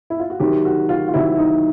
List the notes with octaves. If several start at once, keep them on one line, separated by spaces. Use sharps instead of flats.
E4
F4
F#4
C3 D#3 F#3 G4
F#4
F4
F4
C3 D#3 F#3 E4
D#4